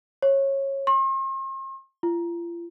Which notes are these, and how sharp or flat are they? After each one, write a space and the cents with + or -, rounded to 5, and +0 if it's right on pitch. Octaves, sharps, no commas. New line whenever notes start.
C#5 -20
C6 +45
F4 -40